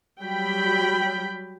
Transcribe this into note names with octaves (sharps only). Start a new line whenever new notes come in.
F#3 G3 G5 B5